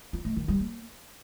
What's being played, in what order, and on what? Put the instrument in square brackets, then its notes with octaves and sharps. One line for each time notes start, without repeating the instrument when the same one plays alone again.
[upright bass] F4
A3
D#3
G3
A#3